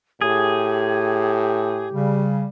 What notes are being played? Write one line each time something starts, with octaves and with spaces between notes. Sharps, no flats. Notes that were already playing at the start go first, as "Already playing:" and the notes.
A2 G4 G#4
C#3 G3